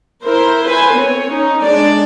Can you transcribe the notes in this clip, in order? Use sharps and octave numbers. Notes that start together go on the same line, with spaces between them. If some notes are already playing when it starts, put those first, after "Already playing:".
E4 A#4 C5
B4 C5 G#5
C4 C#5
C#4 D#4
G#3 D4 D5